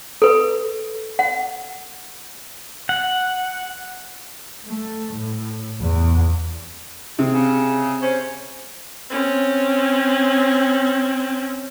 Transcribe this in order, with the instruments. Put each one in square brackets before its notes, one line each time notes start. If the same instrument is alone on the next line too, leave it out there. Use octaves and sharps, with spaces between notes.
[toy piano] A4 B4
F#5
[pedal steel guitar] F#5
[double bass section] A3
A2
E2
[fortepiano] C3 [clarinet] G#4
[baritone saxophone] C#3
[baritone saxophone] C#4 [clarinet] C5
[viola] C4 C#4